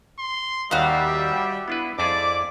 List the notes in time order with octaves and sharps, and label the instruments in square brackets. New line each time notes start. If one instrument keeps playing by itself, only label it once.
[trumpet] C6
[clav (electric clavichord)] D#2 D#3 [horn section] G3 [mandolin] F#4 F5 [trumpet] E5
[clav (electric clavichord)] B3 D4 B4 [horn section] E4
[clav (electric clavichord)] F2 E4 G#4 [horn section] C5 D5 [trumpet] D6